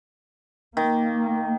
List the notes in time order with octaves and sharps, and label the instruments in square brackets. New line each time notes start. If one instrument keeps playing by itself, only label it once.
[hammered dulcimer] D#3 [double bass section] A#3